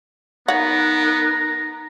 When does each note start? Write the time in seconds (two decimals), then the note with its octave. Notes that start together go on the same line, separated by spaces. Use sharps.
0.48 B3 D#4 A#4 C#5 F#5 A#5